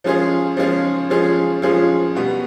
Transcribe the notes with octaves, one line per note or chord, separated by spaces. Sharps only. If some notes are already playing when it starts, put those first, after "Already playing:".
F3 G#3 C#4 F4 G#4
F3 G#3 C#4 F4 G#4
F3 G#3 C#4 F4 G#4
F3 G#3 C#4 F4 G#4
B2 G3 B3